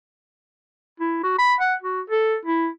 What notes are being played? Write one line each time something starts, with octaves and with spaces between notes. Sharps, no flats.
E4
F#4
B5
F#5
F#4
A4
E4